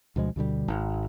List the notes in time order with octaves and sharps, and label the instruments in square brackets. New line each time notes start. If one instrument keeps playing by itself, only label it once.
[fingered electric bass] D2 B2 F3 G#3
D2 B2 D3 G3
G#1